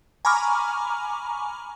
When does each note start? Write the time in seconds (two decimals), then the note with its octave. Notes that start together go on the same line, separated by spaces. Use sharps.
0.25 G#5 A#5 B5 C#6 D6 F6